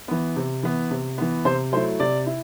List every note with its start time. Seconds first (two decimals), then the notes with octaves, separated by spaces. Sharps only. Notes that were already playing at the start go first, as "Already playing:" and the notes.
0.08 E3 B3
0.36 C3
0.63 E3 B3
0.91 C3
1.18 E3 B3
1.45 C3 C5
1.72 F#3 A3 E4 C5
2.00 C3 D5
2.26 E4